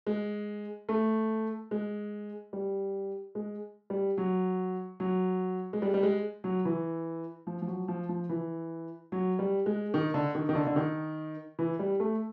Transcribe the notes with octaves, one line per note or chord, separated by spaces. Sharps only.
G#3
A3
G#3
G3
G#3
G3
F#3
F#3
G#3
G3
G3
G#3
F#3
E3
F3
F3
F#3
F3
F3
E3
F#3
G3
G#3
D#3
D3
D#3
D#3
D3
D3
D#3
E3
G3
A3